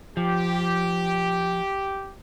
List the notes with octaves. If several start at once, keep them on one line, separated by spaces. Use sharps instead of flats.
F3 G4